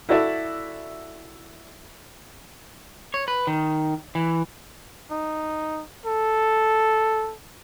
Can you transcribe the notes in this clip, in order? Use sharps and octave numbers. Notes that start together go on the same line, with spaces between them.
E4 F#4 A4 D5 E5
C#5
B4
D#3
E3
D#4
A4